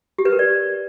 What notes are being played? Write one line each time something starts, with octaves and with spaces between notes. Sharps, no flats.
G4
B4
A#4
D5